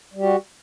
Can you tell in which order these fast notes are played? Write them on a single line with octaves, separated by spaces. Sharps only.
G3 G4 F#4